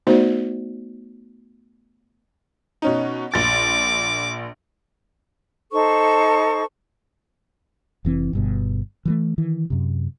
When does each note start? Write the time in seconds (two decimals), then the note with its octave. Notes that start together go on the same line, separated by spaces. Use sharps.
0.07 A3 B3 D#4 F#4 C5 D5
2.82 B2 C#4 D#4
3.34 A#1 D6 A6
5.72 D#4 A4 C5 C#6
8.05 F1 E3 C4
8.33 G1 G2 B2
9.05 E3 F3 A3
9.38 D#3 E3
9.70 F#2 C3